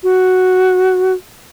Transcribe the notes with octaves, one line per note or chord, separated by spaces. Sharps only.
F#4